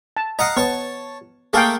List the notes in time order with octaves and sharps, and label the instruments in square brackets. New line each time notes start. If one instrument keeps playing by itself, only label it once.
[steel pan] A5
[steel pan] D#5 [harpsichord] F5 F#5 A#5
[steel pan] B3 [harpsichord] C#5 A5
[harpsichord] A3 A#3 A4 [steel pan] G#4 F5 G5